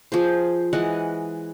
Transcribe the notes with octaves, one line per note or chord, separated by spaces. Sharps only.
F3 G#4 C5
E3 G#3 D#5 F#5